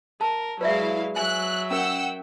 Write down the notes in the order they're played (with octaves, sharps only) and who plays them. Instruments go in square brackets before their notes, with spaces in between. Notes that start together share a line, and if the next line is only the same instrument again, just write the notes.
[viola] A#4 [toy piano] A5
[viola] F#3 G#3 [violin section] E4 F5 [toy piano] B4 D5 E5
[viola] F#3 E5 [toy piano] G#5 [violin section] F#6
[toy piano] C#4 A#4 [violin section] F#5 G5 E6